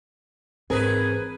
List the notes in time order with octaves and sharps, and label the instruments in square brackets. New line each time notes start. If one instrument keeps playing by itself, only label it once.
[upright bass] G#1 E3 [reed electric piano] C4 A#4 [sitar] G#4 B4